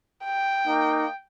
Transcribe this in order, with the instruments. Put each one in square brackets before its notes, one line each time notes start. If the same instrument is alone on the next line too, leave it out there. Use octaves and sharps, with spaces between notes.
[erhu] G5
[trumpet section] A#3 D#4